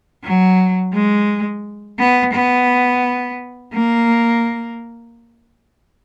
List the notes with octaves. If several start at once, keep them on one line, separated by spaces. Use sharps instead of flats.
F#3
G#3
B3
B3
A#3